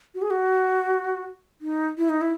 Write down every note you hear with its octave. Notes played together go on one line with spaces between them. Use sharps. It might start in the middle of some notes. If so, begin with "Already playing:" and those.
F#4
G#4
F#4
D#4
E4
D#4
E4